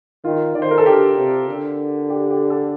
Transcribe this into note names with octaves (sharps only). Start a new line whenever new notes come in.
D#3 F4
D#3 D5
C5
A#4
A4
D3 G4
C3
D3
G4
G4
A4